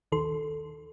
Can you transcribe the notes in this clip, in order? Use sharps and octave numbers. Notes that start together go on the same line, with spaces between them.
A#1 D#2 D#3 A4 C6